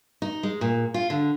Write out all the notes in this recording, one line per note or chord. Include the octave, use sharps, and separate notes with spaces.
D#4
G#3
A#2
F4
D3